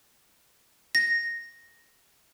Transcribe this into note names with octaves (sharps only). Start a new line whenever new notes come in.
A#6